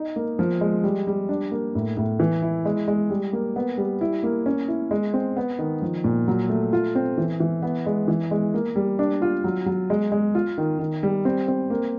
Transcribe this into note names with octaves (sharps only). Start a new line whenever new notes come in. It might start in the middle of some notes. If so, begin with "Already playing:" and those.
Already playing: D#4
A#3
F3
G#3
G3
G3
D4
A#3
A2
A2
E3
E4
G#3
G#3
G3
A#3
B3
G3
E4
A#3
C#4
E4
G#3
C4
B3
D#3
F3
A#2
F#3
A3
F4
C4
E3
E3
B3
G#3
E3
G#3
A#3
G3
D4
F4
F#3
F#3
G#3
G#3
F4
D#3
D#3
G3
C4
C4
A#3